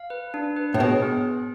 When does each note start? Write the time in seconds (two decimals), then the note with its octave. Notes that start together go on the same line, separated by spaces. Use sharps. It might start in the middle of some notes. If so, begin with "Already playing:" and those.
Already playing: F5
0.10 B4
0.34 D4
0.56 B4
0.74 A2
0.80 B2 G#4
1.02 B3